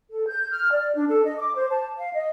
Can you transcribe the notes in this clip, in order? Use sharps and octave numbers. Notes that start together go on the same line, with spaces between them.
A4
G6
F6
D5
D4
A4
D#5
D6
C5
A5
F5
D#5